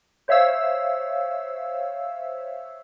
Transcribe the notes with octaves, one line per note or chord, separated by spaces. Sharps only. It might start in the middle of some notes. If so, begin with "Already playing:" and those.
C5 C#5 E5 F5 E6